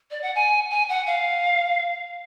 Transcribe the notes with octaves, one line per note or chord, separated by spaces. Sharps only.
D5
F#5
G#5
G#5
F#5
F5